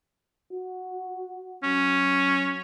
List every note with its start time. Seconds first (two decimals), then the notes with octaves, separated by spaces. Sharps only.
0.53 F#4
1.63 F#3 C#4